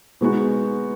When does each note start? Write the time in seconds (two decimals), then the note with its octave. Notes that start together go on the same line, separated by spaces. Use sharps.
0.21 B2 G#3 B3 D#4 F#4